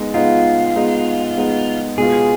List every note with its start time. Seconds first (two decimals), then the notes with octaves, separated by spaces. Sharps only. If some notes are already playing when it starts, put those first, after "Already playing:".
Already playing: G#3 B3 D#4
0.14 G#3 B3 D#4 F4
0.76 G#3 B3 D#4
1.37 G#3 B3 D#4
1.98 B2 G#3 B3 F4 G#4